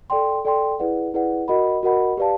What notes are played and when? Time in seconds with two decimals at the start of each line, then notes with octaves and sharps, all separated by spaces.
0.10 A4 D5 G5 C6
0.45 A4 D5 G5 C6
0.79 E4 G#4 B4 D5 F#5
1.14 E4 G#4 B4 D5 F#5
1.48 F#4 A#4 D#5 F#5 B5
1.83 F#4 A#4 D#5 F#5 B5
2.17 G4 B4 D5 F5 A5